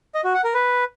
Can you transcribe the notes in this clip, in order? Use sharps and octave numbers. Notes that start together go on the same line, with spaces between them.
D#5
F#4
F#5
A#4
B4